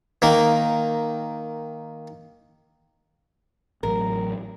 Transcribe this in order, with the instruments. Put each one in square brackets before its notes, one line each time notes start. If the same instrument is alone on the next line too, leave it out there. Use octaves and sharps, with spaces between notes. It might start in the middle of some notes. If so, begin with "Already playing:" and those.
[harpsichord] D#3 A#3
[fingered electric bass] A1 A2 F#3 [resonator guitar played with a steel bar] A#4